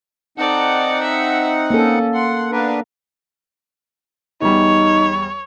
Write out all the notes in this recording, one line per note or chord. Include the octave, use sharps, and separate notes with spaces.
C4 D#4 A4 D5 F#5
E5
A#3 C#4 A4
F#5 C6
B3 D4 A#4 B4 F5
E2 G3 D#4 C#5